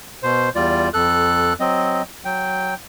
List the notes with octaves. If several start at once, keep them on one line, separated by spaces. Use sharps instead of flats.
B2 C5
E2 G3 F4 D5
F2 A4 F#6
F#3 C4 D#5
F#3 G5